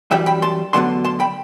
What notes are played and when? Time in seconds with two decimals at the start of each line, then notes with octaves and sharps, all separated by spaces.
0.11 F#2 E3 G3 E5 G5
0.26 G5 B5
0.42 A5 C6
0.73 D2 D3 F#3 B3 D4 A5 C6
1.04 A5 C6
1.20 G5 B5